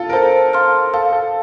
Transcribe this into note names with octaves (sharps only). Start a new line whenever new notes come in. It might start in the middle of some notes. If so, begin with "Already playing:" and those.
Already playing: F4 A4
A#4
A4 C5
F5 C6 F6
A4 F5
A4